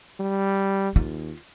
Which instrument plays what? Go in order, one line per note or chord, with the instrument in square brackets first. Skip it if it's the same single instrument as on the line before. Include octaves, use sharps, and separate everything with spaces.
[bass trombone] G3
[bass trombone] D#2 [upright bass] F4